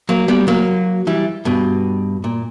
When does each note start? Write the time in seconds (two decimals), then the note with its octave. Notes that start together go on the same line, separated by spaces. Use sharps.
0.09 F#3 A#3
0.28 G3 B3
0.48 F#3 A#3
1.07 E3 G3
1.45 G2 B2
2.24 A#2